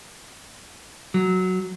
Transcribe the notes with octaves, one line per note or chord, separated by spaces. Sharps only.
F#3